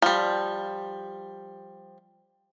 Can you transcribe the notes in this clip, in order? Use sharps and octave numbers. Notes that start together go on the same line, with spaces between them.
F3 G3